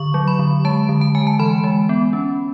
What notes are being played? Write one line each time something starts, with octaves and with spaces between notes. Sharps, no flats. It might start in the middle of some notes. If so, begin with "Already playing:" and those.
Already playing: D3 C#6
F#3
B5
D3
G#3 A5
D3
A5
G#3 G#5
A5
E3 B5
G#3
B3
C#4